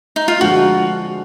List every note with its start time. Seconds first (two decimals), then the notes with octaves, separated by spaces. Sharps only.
0.16 D#4
0.28 F4
0.40 D3 F3 G#3 D4 F#4